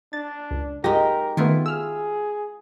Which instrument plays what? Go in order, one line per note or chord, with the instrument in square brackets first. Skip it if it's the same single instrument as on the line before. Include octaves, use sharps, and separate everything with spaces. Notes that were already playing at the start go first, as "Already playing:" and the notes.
[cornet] D4 [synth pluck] A6
[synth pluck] C#2
[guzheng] G#3 D#4 [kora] G4 [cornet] A#4 [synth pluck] A#6
[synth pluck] D#3 A3 B3 [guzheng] E4 F4
[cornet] G#4 [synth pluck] E6 F6